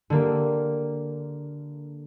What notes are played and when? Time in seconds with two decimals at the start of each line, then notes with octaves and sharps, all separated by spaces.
0.10 D3 A#3 G4